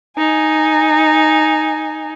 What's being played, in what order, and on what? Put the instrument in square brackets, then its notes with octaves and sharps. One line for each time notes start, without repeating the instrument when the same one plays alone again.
[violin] D#4 G#5